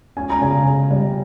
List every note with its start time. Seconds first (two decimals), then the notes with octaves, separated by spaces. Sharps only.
0.17 C#4 G#5
0.30 A#5
0.41 C#3 G#5
0.66 C#3
0.91 G3